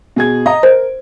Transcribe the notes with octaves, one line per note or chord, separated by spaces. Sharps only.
B2 G#4 G#6
D#5 A#5
A#4 C5